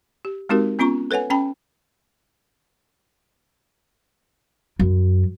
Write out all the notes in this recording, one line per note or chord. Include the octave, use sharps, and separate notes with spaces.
G4
G#3 C4 D#4 F#4 G4 A#4
B3 C#4 F4 A#5 C#6
A4 B4 C#5 F#5 G#5
C#4 G5 A5 B5
F#2